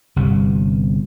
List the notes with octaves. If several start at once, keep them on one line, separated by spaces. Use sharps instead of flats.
G1 C3